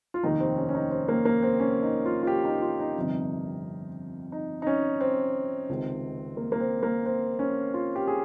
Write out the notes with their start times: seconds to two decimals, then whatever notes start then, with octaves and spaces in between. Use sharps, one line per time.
0.14 F4
0.23 F1 D#2 D#3 D#4
0.40 C4
0.57 C#4
0.69 C#4
0.75 D#4
0.91 C4
1.09 A#3
1.25 A#3
1.43 C4
1.60 C#4
1.82 D#4
2.06 F4
2.23 F4
2.27 G4
2.45 D#4
2.62 F4
2.79 D#4
2.97 G1 F2 C3
4.32 D#4
4.62 D#4
4.67 C#4
5.01 C4
5.69 C#2 C3 D#3
6.37 A#3
6.52 A#3
6.60 C4
6.83 A#3
7.06 C4
7.39 C#4
7.74 F4
7.96 G4
8.07 G#4